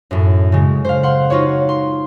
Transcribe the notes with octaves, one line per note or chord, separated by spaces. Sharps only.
F#2 A2
C#3 G#3
C5 F5
F#5 C6
D#4 F4 F#4 C#5
C6